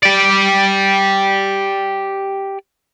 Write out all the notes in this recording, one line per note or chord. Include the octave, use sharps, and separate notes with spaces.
G4 D5